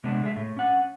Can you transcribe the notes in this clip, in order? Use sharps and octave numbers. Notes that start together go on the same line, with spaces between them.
C3 G#3 B3 D4
G#3 G#4 E5
A2
C#4 F#5